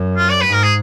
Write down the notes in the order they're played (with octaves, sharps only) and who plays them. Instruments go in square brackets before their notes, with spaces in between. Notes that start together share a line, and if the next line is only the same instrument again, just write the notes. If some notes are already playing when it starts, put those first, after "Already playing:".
Already playing: [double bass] F#2
[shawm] F4
D5
B4
[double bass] G#2
[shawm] A#4
G#4